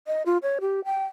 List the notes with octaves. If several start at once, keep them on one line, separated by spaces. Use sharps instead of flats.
D#5
F4
C#5
G4
G5